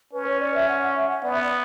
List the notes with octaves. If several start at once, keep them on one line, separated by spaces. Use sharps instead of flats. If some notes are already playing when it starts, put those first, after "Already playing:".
C#4 B4
C#5
D5
E5
F#5
F#5
E5
F#5
B3 D5
E5
D5